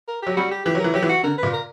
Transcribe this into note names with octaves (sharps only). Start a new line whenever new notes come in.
A#4
F#3 G4
G3 F#4
G4
E3 G4
F#3
E3 A#4
F#3 G4
E3
F#4
D3 A#4
A#2 B4
A#4